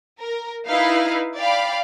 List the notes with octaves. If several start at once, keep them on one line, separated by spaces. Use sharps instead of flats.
A#4
D#4 E4 B4 F5
D5 F5 G5 B5 D6